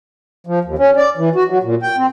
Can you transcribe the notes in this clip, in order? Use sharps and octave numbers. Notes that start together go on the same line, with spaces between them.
F3
D#2
C#4
D5
E3
F#4
F#3
A#2
G5
C4